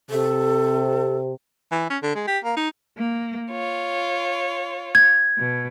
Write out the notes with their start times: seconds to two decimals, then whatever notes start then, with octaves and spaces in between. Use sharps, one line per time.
0.10 C3 A4
1.72 E3
1.90 C#4
2.03 D3
2.15 G#3
2.28 G4
2.44 A#3
2.57 D#4
2.96 A#3
3.51 F4 C#5
4.95 G#6
5.37 B2